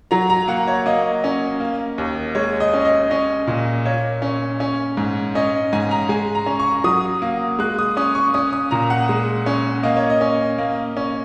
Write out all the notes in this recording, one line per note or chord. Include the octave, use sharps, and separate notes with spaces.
F#3 A#5
A#5
A#3 F#5
C#5
A#3 D#5
C#4
A#3
D#2
G#3 C#5
D#5
C#4
D#5
C#4 D#5
A#2
A#3 C#5
C#4
C#4
G#2
C#4 D#5
G#2 G#5
A#5
G#3 G#5
A#5
C#4
C#6
F#3 D#6
A#3
G#3 F#6
D#6
C#4 D#6
C#6
C#4 D#6
D#6
A#2 A#5
F#5
G#3
C#4
A#3 D#5
C#5
D#5
C#4
A#3
C#4